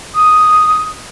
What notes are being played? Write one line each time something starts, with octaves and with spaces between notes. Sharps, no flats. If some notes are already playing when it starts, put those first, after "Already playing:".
D#6